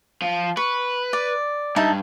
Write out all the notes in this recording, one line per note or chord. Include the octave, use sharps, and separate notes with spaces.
F3
B4 C#6
D5
G2 D#4 E5 A5